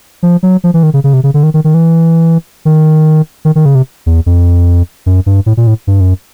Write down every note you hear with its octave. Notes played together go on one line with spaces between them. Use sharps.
F3
F#3
F3
E3
D#3
C#3
C#3
C3
C#3
D3
D#3
D#3
D#3
E3
D#3
D#3
D#3
C#3
C3
E2
F2
F#2
G2
A2
A#2
A2
G2
F#2